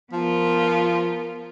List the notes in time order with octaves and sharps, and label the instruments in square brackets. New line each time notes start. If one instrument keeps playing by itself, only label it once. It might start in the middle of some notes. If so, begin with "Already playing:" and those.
[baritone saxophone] F3 [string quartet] B3 F4 A#4